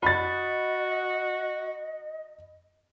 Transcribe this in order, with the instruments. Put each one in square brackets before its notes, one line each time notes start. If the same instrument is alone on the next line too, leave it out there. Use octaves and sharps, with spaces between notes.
[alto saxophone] F#4 [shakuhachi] D#5 [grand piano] B5 A6